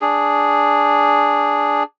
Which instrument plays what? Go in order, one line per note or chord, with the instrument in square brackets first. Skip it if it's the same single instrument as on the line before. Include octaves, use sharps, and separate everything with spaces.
[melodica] D4 G#4